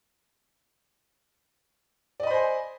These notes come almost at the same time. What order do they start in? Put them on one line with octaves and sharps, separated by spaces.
D5 D#5 B5 C5 G#5